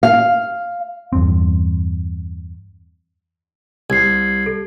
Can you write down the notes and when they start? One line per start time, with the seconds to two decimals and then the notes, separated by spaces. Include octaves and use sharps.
0.03 F5
1.13 E2 G2 C4
3.90 C2 G#6 C7
4.46 A4